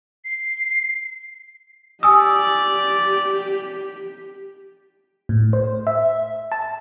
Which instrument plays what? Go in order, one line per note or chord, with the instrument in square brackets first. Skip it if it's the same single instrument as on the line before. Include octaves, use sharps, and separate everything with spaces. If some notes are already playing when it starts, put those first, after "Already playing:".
[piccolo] C7
[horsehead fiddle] G4 [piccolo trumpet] D5 [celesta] G#5 E6 [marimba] D#6
[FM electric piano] A2
C5
E5
A5